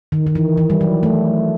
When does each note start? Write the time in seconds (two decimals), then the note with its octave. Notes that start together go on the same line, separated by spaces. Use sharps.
0.12 D#3
0.27 D#3
0.35 E3
0.57 E3
0.70 G3
0.81 F#3
1.03 A3